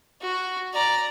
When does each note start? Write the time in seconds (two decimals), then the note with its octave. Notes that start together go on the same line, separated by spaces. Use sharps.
0.21 F#4
0.74 D5 A#5